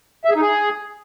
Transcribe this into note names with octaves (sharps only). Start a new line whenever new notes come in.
E5
G#4
D#4
G#4